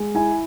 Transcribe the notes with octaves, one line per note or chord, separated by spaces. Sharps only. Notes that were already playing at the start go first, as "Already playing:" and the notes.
Already playing: G#3
E4 G#5